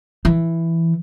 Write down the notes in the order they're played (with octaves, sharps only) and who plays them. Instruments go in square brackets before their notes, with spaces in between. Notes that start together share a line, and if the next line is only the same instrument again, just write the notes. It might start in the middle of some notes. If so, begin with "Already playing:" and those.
[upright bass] E3